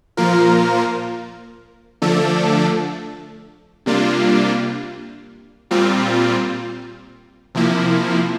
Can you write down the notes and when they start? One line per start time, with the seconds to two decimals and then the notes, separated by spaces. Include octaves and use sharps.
0.17 A#2 F3 A#3 F4 A#4
2.02 D3 F3 A3 D4 A4
3.86 C3 G3 A#3 D4 F4
5.71 A#2 G3 C4 F4
7.55 C3 F3 A#3 E4